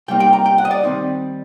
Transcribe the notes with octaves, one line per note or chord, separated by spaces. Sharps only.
C3 G3 A#3 D#4 G5
G5
A#5
G5
F#5
D#5
D5
D#3 G3 C4 D#4